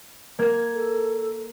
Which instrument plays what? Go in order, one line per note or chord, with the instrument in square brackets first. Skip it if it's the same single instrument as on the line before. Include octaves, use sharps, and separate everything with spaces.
[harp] A#3 G#6
[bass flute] A4